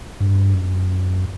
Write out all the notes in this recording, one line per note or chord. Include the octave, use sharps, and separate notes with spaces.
G2
F#2